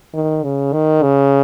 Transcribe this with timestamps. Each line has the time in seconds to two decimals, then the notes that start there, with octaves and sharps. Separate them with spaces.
0.14 D#3
0.44 C#3
0.73 D#3
1.03 C#3